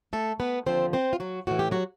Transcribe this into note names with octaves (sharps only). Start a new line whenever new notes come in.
A3 A4
B3 B4
D#2 D3 F3 C4 C5
C4 C5
F4
F#3 F#4
A2 E3 F#4
G4
F#3 F#4